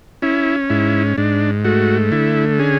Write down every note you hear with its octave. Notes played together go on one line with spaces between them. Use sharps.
C#4 E4
G#2 E4
G#2 D4
A3 F#4
D3 E4
C#4 G#4